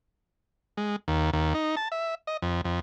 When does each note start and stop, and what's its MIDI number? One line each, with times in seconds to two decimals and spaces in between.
0.77 0.96 56
1.08 1.31 39
1.33 1.54 39
1.54 1.75 63
1.77 1.88 81
1.92 2.15 76
2.27 2.37 75
2.42 2.61 41
2.65 2.80 41